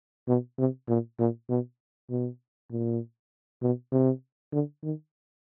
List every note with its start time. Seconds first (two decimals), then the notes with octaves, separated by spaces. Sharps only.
0.28 B2
0.58 C3
0.88 A#2
1.19 A#2
1.50 B2
2.10 B2
2.71 A#2
3.62 B2
3.92 C3
4.53 D3
4.83 D#3